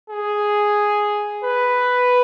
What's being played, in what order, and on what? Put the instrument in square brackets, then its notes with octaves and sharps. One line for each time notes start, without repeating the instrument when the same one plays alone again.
[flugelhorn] G#4
B4